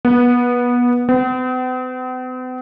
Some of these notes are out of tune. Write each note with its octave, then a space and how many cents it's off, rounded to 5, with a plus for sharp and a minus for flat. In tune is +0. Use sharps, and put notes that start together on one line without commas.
B3 -20
B3 +45